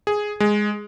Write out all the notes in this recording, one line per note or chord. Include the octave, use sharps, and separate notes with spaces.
G#4
G#3